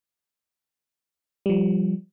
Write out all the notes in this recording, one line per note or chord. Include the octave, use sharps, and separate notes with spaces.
F3 G3